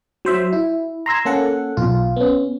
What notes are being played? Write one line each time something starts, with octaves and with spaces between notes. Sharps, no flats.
F#3 C5 E5
E4
A#5 C6 E6 G#6
A#3 C#4 A4 F#5
B1 F4
B3 C#4